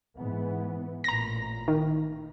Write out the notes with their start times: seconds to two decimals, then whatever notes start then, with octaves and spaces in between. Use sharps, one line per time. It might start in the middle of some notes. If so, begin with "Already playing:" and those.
0.18 G#2 E3 B3
1.04 A1 A#2 A#5 A#6
1.68 D#3